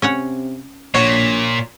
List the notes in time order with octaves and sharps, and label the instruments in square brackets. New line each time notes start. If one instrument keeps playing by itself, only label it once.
[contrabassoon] C3 [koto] C#4 C#5 F#5
[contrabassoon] A#1 [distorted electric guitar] A#2 [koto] F#4 [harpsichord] C#5